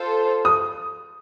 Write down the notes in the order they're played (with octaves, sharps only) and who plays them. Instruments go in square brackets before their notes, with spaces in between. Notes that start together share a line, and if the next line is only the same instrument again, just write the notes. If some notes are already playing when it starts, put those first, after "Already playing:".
Already playing: [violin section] F4 A4 C5
[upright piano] D#6